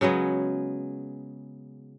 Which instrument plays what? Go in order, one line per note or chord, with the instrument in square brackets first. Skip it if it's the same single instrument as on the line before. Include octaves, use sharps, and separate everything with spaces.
[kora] C#3 F#3 G#3 B3